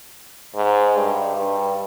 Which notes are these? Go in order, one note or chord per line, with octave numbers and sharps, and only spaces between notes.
G#2
G2
G2